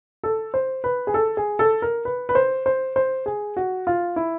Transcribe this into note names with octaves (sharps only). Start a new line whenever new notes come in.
A4
C5
B4
G#4
A4
G#4
A4
A#4
B4
B4
C5
C5
C5
G#4
F#4
F4
E4